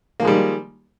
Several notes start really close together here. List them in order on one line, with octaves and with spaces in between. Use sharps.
A#3 F3 G#3 G3 D#3